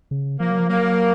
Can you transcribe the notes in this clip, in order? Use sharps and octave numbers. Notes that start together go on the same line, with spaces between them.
C#3
F3 A#3
F#3
F3
F#3 A#3